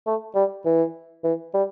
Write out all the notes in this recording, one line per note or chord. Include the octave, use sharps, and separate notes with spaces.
A3
G3
E3
E3
G3